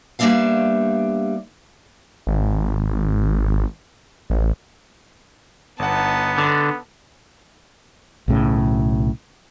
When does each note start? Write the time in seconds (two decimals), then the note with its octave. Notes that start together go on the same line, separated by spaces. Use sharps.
0.19 G3 A#3 B3 D4 E5 F5
2.27 G#1
4.30 A1
5.79 G1 B3 D#4 F#5 A5
6.38 D3
8.28 B1 A2 C#3